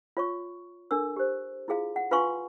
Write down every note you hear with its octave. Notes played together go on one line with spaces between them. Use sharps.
F4 C#5 C#6
D4 A4 A#4 E6
G4 C5
E4 F4 G#4 F5
F#5
F4 B4 F5 G#5 C6 C#6